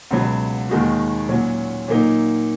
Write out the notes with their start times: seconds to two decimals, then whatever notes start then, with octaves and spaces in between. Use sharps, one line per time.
0.11 C#2 B2 F#3
0.69 D#2 D#3 G#3 D#4 F#4
1.29 A#2 F#3 C#4
1.88 A#2 F#3 A#3 D#4